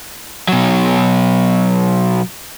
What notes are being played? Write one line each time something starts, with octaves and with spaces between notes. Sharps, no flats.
B2 F#3